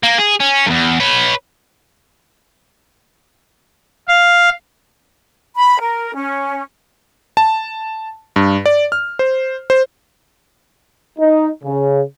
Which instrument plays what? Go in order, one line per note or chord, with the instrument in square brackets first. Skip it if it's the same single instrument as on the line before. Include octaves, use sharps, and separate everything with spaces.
[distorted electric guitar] A#3
G#4
C#4
E2 G2
B4 C#5
[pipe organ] F5
[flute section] B5
A#4
C#4
[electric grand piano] A5
G2
D5
F6
C5
C5
[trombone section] D#4
C#3